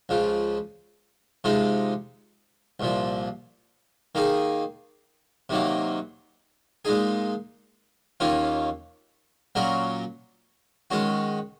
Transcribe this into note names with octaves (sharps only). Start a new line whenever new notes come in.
C#2 C#3 F3
C3 F3 G#3 D#4
C2 A#2 F3
D#3 A#3 D#4 G#4
C3 D#3 F#3 A#3
A#2 G#3 D#4 G#4
D#2 D#3 A#3 C#4 F4
A#2 F#3 C#4 F#4 A#4
D#3 G#3 C#4 F#4